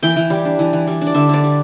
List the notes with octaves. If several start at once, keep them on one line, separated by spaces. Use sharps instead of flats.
E3 G5
E3
G3
D4
E3
E3
G3
D4
D5
D3 E5
D3 D5
G3